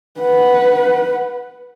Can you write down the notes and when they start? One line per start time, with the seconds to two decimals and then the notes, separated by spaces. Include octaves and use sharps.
0.20 B4 F#5